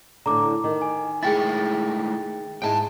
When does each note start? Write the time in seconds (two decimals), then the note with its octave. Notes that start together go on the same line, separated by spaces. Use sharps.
0.26 A2 D3 A#5 D6
0.64 D#3
0.82 G#5
1.23 G#3 A3 E4 G#4 G5 A6
2.62 G#2 G#3 E4 G5 A5